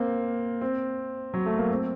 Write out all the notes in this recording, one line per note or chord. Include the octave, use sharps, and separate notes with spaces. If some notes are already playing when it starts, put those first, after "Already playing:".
Already playing: A#3 C4
C4
F#3
A3
A#3
C4